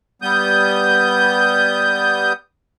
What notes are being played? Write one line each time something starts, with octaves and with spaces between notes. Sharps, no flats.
G3 B3 D#6 G6